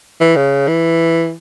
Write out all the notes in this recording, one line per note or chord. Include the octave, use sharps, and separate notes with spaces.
E3
C#3
E3